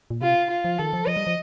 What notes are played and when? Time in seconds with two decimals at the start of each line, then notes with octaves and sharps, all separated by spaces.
0.10 A#2
0.22 C3 F4
0.50 F4
0.64 F3
0.79 D#3 A4
0.93 F3
1.07 F3 D#5
1.17 G3
1.27 F3